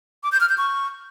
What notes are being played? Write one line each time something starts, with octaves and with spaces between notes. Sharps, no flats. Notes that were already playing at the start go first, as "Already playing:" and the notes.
D6
G6
F6
G6
C#6